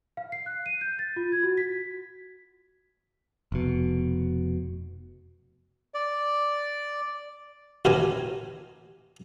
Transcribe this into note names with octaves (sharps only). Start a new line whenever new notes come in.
F5
C7
F#6
D#7
G6
A6
F4
G#6
F#4
B6
F1 B2
D5
A1 D#2 B2 G4 A#4 G#5